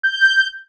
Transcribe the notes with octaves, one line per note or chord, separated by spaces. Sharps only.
G6